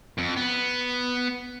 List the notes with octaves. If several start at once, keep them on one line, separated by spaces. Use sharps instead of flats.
F2
B3